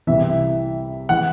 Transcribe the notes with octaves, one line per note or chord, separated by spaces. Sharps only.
C2 C3 E3 E5
E3 F#5